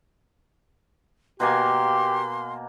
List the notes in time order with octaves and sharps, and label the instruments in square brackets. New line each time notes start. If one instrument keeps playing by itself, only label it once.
[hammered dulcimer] B2 A#3 G#5 [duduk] G4 [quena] C6